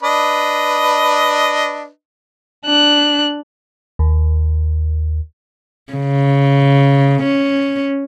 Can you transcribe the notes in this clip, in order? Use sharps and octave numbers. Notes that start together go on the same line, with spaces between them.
D4 B4 D#5
D4 F#6
D#2
C#3
C#4